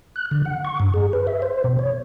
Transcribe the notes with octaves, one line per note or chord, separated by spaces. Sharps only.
F#6
D3
F#5
C#6
G2
G#4
B4
E5
C5
B2
C#5